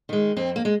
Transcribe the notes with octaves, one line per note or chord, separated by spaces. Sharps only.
D#3 G#3
F2 C4
A#3
G#3